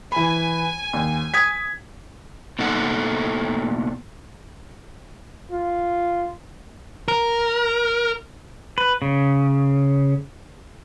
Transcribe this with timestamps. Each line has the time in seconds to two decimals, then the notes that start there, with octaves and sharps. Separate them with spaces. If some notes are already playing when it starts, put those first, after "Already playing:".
0.12 E3 G#5 B5
0.93 D#2
1.34 D#6 G#6 B6
2.59 B2 A3 A#3 D#4 A4 F#5
5.51 F4
7.08 A#4
8.78 B4
9.02 C#3